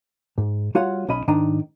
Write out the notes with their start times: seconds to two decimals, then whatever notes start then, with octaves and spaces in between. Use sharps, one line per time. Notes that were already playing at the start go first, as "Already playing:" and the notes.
0.38 G#2
0.75 G3 F4 F#4 C#5 F5 F#5
1.09 B1 C#4 D#5 B5
1.28 G#2 D#3 D4 D#5 G5 A#5